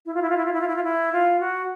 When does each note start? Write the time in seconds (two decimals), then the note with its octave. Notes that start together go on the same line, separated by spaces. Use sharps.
0.06 E4
0.15 F4
0.22 E4
0.30 F4
0.37 E4
0.46 F4
0.53 E4
0.61 F4
0.68 E4
0.76 F4
0.83 E4
1.13 F4
1.40 F#4